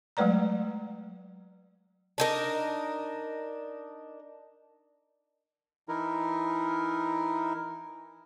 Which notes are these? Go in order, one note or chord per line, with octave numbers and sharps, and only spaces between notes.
F#3 G#3 A3 B4 D5 A#5
D4 D#4 A#4
E3 D#4 E4 A#4